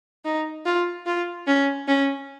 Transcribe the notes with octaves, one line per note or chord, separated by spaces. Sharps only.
D#4
F4
F4
C#4
C#4